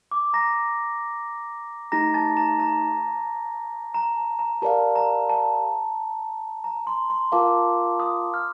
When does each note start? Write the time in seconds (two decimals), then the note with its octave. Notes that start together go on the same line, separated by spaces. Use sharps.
0.11 D6
0.34 A#5 A#6
1.92 A3 D#4 G4 A#5 A#6
2.14 A5 A6
2.37 A#5
2.60 A#5
3.95 A#5
4.17 A5
4.39 A#5
4.62 G4 A#4 D5 F5 A5
4.96 A#5
5.30 A5
6.64 A#5
6.87 C6
7.10 C6
7.32 F4 A#4 F5 A5 D6
8.00 D#6
8.34 F6